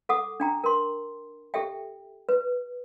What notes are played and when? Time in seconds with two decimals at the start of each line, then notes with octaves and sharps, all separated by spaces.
0.09 A4 F#5 D6 D#6
0.40 D4 G5 A#5
0.64 A#4 C6
1.54 G4 A4 E5 G5
2.29 B4